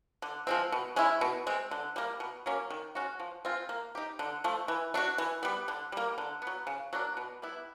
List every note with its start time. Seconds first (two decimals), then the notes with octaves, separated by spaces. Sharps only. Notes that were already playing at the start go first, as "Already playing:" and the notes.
0.22 D3
0.47 F3 G#3 C4
0.72 B2
0.96 G#3 C#4 E4
1.21 B2
1.47 G#3 C4
1.71 D3
1.96 G3 A#3
2.20 B2
2.46 F#3 A#3 C#4
2.70 D#3
2.95 G#3 C#4 F#4
3.20 F3
3.45 G#3 C4 F4
3.69 A#3
3.95 D#4 G4
4.19 D3
4.44 F3 A3
4.68 E3
4.94 A3 D4 F#4
5.18 E3
5.43 G3 B3
5.68 D3
5.92 G3 A#3
6.18 D3
6.42 F#3 B3
6.67 C#3
6.93 F#3 A#3 D4
7.17 B2
7.42 G3 B3 E4